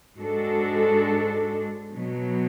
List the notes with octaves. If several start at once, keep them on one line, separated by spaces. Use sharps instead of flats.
G#2 G#3 D4 F#4 A4
B2 F#3 B3